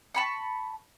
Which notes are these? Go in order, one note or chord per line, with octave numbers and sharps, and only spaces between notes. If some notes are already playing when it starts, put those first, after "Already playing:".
A5 B5 C#6